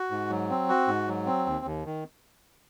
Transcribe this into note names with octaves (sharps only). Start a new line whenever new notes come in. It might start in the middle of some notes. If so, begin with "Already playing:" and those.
Already playing: F#4
G#2
F#3
C4
F#4
G#2
F#3
C4
D#2
D#2
D#3